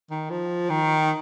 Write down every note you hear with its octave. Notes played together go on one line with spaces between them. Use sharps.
D#3
F3
D#3